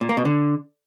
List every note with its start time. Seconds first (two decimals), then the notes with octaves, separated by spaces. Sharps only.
0.01 A#2
0.09 A#3
0.17 B2
0.25 D3